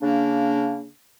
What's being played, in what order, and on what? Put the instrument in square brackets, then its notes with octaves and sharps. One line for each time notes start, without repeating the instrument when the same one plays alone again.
[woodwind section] C#3 A#3 D4